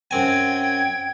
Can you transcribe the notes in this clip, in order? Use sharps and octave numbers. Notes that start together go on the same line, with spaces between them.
F#2 C4 G5 G#5 G#6